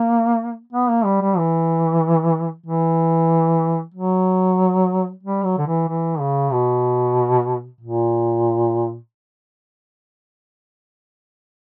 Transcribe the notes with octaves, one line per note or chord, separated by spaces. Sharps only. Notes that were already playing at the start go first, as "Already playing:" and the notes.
Already playing: A#3
B3
A#3
G3
G3
E3
E3
F#3
G3
F#3
D3
E3
E3
C#3
B2
A#2